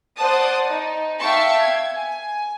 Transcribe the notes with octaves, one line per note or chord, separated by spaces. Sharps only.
C5 D5 F#5 A5 D#6
D#4
E5 F5 G5 A5 C#6
G#6
G#5